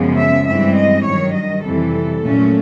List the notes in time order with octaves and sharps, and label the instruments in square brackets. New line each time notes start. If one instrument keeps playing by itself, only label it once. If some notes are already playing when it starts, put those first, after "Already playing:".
Already playing: [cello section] F#2 C#3 F3 G#3 B3
E5
G2 E3 G#3 C4 E5
D#5
G2 D#3 F#3 C#5
D#5
F2 C3 E3 G3 A4
A#2 F#3 A3 C#4